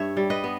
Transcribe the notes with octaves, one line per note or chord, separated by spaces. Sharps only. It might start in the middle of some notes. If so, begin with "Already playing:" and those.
Already playing: G2 C#5 E5
G3
B4 D#5
B3